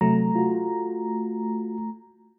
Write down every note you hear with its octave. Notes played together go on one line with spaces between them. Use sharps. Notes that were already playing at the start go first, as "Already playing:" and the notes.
C3 F#3 A3 A#5
F4 F#4